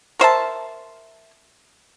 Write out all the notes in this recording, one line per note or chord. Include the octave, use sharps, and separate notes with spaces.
A#4 C5 E5 A5